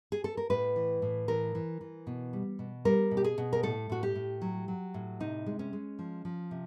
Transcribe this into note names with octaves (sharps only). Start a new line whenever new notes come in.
G#4
A4
A#4
A2 B4
E3
A2
E3 A#4
E3
E3
B2
G3
B2
G3 A#4
B2
G4
G#4
B2
A#4
A2 A4
A2 F#4
G4
A2
F#3
F#3
A2
C3 D#4
G#3
C#4
G#3
F3
F3
C3